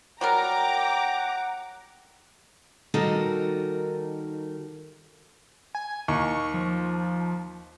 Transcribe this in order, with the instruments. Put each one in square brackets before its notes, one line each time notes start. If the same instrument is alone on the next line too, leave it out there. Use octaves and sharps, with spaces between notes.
[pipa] F#3 G3 A#4 [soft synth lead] F#5 [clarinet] G5 [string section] A#5 D6
[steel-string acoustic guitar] D#3 G3 D#4 F#4 A4 A#4
[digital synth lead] G#5
[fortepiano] D#2 [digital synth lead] C#6
[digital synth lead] F3